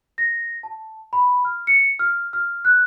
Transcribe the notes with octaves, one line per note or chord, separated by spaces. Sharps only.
A#6
A5
B5
F6
C#7
F6
F6
F#6